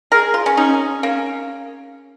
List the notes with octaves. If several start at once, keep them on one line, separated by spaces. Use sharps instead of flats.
G#4 A#4
F4
C#4
C#4 D#4
A#3 C#4